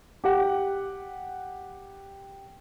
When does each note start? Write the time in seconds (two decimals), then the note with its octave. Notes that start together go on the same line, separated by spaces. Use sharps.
0.24 G4 F#5